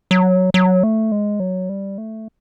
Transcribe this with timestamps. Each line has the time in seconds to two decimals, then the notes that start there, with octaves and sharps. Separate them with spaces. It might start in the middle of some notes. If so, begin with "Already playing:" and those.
0.11 F#3
0.54 F#3
0.83 A3
1.12 G#3
1.40 F#3
1.69 G3
1.98 A3